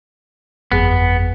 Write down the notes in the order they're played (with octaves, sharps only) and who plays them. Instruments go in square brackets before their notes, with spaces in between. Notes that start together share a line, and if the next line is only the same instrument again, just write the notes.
[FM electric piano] G1 F2 G#4 [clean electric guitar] B3